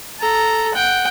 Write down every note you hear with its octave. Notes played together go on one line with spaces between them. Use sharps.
A4 A#5
F#5 G5